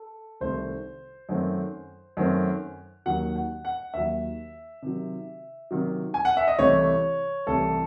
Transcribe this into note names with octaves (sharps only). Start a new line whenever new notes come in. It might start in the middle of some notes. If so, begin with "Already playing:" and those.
Already playing: A4
C2 C3 D#3 A3 C5
F#2 D#3 A3 C4
F#2 D#3 A3 C4
D#2 D#3 F#3 F#5
F#5
F#5
D#2 D#3 F#3 E5
C3 D#3 F#3
C3 D#3 F#3
G#5
F#5
E5
D#5
C2 C3 E3 A3 C#5
C2 C3 E3 A3 A4